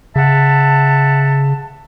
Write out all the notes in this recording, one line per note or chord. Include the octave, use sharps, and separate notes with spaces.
C#3 E5 F#5 A5